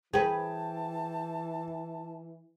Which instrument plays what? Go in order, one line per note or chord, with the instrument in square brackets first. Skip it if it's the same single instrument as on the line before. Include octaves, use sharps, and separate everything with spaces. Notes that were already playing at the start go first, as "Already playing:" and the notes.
[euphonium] E3 [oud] G#4 B4 [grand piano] G5 [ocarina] A5